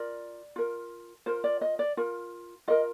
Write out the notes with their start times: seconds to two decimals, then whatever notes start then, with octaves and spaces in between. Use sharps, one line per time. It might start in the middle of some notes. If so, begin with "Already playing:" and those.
Already playing: F4 A#4 D5
0.56 F4 A#4
1.26 F4 A#4 C5
1.44 D5
1.61 D#5
1.79 D5
1.97 F4 A#4
2.68 F4 A#4 D#5